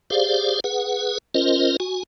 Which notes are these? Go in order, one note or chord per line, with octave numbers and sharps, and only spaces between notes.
G4 G#4 C5 D5 F5
G#4 B4 F#5
C#4 F4 A#4 C5 D#5
F#4 G#5